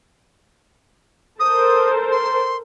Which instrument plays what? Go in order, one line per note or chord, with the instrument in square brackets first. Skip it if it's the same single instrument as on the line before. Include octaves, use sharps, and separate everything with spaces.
[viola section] A4 A#4 C5 [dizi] D#6
[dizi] C6